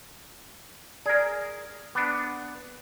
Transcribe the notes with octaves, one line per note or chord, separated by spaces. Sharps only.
G#4 A#4 D5
B3 D4 B5 D6